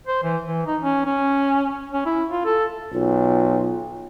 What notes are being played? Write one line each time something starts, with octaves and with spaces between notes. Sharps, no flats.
C5
E3
E3
D#4
C#4
C#4
C#4
E4
F4
A4
B1 F4